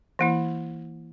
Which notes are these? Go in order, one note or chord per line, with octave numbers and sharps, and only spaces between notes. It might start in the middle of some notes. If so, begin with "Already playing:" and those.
E3 A#3 E4